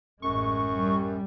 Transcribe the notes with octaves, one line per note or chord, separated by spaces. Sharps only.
A1 F#2 G#3 C#6
G3